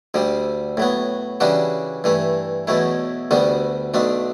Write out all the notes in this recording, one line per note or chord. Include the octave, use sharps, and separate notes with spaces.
D2 D3 G3
A2 F#3 B3
C#3 E3 G3 D4 F#4
G2 E3 A3
E2 B2 F#3 A3 E4
D2 D3 G3 B3 F#4
B1 B2 A3 D4